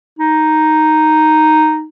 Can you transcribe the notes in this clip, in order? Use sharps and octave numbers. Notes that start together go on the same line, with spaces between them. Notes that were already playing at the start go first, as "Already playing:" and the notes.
D#4